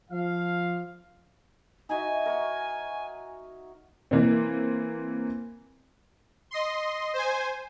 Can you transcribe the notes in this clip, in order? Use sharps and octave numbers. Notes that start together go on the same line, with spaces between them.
F3 F5
D#4 F#4 E5 G#5
A#4 C#5 F#5
E3 A#3 C4
D#5 C6
C5 G#5